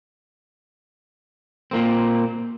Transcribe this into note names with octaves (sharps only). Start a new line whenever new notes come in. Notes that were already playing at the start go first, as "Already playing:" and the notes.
A#2 A#3 C4